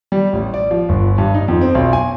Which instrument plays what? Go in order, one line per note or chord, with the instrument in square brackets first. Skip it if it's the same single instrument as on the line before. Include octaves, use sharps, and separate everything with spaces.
[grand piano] G3
A1
D5
F3
G1
G2
D#4
F2
C4
B1
G#5